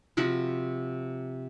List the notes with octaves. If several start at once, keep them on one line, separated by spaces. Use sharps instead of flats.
C3 F3 F#4 B5